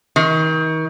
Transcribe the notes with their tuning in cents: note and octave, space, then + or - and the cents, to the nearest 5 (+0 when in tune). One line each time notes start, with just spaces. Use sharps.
D#3 +35